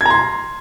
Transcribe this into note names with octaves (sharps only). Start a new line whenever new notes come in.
A#5 C6 G#6